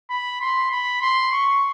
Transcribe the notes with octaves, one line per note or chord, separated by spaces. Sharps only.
B5
C6
B5
C6
C#6